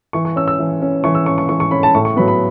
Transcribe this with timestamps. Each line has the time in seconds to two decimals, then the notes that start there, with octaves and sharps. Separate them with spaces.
0.13 E3 C#6
0.25 C#6
0.36 C#4 E6
0.48 E6
0.59 E3
0.82 C#4
1.04 E3 C#6
1.15 E6
1.26 C#4 C#6
1.38 C#6
1.49 E3 C#6
1.60 C#6
1.71 C#4 B5
1.83 A5
1.95 A2 C#6
2.05 C#6
2.16 F#3 B3 B5
2.28 B5